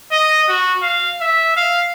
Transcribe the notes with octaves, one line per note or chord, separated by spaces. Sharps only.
D#5
F#4
F5
E5
F5